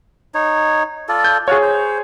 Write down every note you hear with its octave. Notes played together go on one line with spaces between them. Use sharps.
D#4 C#5
F4 A4 D5
G6
F4 F#4 G#4 C#5
C5